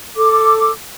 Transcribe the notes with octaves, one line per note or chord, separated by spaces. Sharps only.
A4 D6